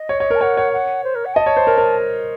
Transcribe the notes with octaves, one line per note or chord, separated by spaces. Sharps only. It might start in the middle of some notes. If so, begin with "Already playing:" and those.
Already playing: D#5
C#5
C#5
A#4 A5
C#5 F#5
C#5
F#5
C5
A#4
F#5
D#5 A5
C#5
C5
A#4
A#4